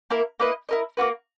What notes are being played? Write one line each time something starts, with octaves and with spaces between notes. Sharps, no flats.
A#3 E4 A#4
A#3 E4 B4 D#5
E4 A#4 D#5
A#3 C#4 F#4 B4